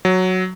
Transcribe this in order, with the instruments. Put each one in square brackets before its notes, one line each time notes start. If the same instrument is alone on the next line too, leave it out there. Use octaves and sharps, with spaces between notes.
[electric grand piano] F#3